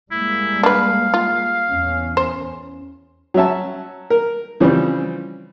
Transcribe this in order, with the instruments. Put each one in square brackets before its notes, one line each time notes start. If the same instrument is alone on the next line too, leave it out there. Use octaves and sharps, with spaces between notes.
[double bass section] G3 G#3 A#3 [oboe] E4
[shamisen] D4 B4 [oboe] F5
[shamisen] F4
[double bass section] E2 C#4
[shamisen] C5
[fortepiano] F#3 C#4 E5 A5
A#4
C#3 E3 F3 G3 C4